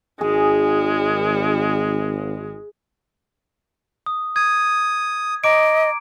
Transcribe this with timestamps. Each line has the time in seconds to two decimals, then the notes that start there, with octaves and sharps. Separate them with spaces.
0.21 G#1 G#3 G#4
4.06 D#6
4.36 D#6 G#6
5.44 D#5 A#5 D6 D7